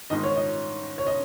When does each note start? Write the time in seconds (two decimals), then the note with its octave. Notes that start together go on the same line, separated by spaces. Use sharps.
0.10 G#2 D#3 D#5
0.23 C#5
0.36 D#5
0.98 C#5
1.07 D#5